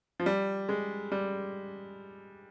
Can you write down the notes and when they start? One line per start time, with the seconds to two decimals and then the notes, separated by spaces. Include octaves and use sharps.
0.20 F3
0.26 G3
0.69 G#3
1.12 G3